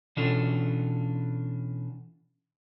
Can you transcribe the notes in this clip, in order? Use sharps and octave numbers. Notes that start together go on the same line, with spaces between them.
B2 E3 C#4 D4 F4 A4